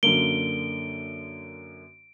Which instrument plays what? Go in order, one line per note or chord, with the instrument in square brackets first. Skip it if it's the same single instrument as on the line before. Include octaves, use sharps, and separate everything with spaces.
[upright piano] F#2 D3 A#3 [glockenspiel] D7 [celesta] G7